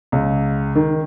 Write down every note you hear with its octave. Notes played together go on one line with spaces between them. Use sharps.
C#2
D#3